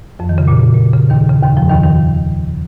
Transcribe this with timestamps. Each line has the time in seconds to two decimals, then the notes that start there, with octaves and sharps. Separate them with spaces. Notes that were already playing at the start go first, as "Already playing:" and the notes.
0.19 F2 F3
0.29 D#3
0.38 C#3
0.48 A#2
0.74 A#2
0.93 C#3
1.10 D#2 D#3
1.29 C#3
1.43 D#2 D#3
1.56 F2 F3
1.69 D#2 D#3
1.84 D#2 D#3